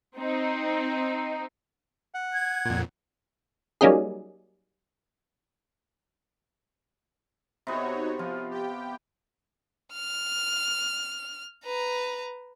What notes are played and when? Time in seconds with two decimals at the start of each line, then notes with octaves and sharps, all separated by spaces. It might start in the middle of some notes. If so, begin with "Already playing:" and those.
0.18 C4 D#4
2.14 F#5
2.33 G#6
2.65 F2 A#2
3.81 F#3 G3 A#3 C#4 D#4 G#4
7.67 C3 B3 D#4 F#4 C#5
8.19 F3 F4
8.51 G4 G5
9.94 F6
11.65 B4 A#5